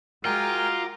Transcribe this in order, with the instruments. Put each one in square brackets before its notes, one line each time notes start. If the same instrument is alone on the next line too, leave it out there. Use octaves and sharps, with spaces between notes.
[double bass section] G#3 [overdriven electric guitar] F4 [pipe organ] F#4 A#5 D6 [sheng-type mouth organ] A#4 G5 G#5